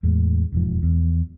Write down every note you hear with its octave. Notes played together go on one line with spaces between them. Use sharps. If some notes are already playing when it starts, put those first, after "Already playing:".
E2 A2 G#3
E1 F2 G#2 F3
E2